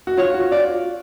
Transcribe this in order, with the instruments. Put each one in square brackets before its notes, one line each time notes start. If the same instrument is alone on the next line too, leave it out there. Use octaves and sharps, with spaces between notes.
[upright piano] F#4
[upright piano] F4 [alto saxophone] C#5
[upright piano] F#4
[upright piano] F4 [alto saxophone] D5